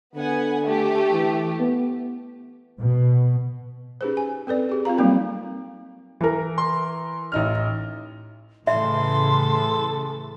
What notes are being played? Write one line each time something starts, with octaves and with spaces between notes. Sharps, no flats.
D3 B3 F#5 G#5
A3 G4
E3
B3
B2
C#4 D#4 G4 G#4 B4 C5
G#5
C4 A4 B4 D5
G4 G#4
C4 F4 F5 A#5
F#3 G3 A#3 C4 D#4 A#4
E3 A#4
C6
A1 D#4 F6
A2 C#3 E3 A4 E5 C6